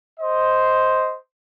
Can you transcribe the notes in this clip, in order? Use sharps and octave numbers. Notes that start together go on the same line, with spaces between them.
C5 D#5